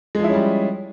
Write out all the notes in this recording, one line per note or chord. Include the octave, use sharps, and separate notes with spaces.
F3 G3 G#3 C#4 E4